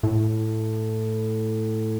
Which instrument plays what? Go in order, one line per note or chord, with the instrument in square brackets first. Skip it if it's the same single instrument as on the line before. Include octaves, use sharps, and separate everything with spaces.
[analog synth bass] A2